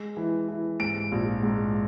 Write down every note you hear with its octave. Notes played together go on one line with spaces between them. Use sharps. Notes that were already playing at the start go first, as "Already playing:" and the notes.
Already playing: G#3
E3
E3
G#2 D7
A#1
G#2